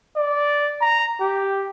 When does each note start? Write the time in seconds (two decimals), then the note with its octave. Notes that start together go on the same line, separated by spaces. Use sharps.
0.17 D5
0.81 A#5
1.21 G4